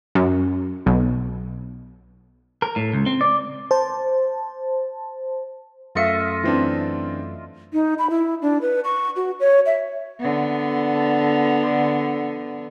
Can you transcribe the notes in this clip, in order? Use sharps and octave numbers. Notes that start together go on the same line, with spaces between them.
F#2
B1
A#4
A2
C#2
C4
D5
C5 A5
F#2 A3 F4 D#5 E5 C#7
E3 C4 D4
D#4
B5
E4
D4
B4
C#6
F#4
C#5
E5
D3 B3